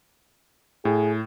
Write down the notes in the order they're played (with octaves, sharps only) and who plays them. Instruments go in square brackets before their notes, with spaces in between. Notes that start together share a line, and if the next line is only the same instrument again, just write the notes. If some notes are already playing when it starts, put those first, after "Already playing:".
[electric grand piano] A2 [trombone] G#4